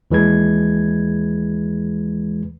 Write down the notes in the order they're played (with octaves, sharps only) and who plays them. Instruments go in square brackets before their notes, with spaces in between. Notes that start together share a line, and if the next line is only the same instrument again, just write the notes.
[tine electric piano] D#2 E3 G#3 B4 G#6